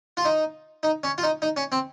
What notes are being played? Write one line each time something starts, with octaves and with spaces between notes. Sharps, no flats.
F4
D#4
D#4
C#4
F4
D#4
D#4
C#4
C4